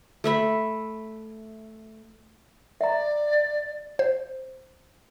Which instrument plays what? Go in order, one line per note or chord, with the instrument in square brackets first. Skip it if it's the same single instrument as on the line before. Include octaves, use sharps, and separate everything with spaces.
[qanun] A3 E5 B5
[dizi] D5 [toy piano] E5 A#5
[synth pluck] C5